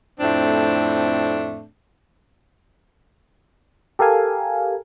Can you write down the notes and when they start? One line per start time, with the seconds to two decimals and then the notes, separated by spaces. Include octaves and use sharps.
0.20 F2 A2 A3 C4 D4
3.99 G4 A4 A#4 F5 G#5